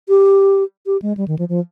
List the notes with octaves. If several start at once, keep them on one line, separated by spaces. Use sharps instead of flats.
G4
G4
G#3
G3
D#3
F3
F3